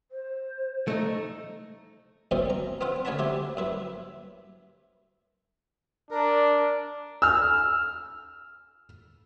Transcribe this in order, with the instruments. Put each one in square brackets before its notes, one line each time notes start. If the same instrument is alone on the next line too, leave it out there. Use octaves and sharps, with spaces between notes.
[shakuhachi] C5
[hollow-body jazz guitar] A3 D#4
[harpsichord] F#2 B2 E3 F3 C4 C#4
A#5
B3 C4 F4 F#5
D2 C#4 C#5 F#5 A5 B5
F3 E4 G4
F#2 E4 B4
[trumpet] D4 [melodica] A#4
[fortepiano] E6 F6